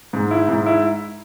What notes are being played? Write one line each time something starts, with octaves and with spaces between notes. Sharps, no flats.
G#2
E4
G#2
E4